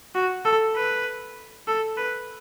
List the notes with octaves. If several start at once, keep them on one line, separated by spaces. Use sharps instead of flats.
F#4
A4
B4
A4
B4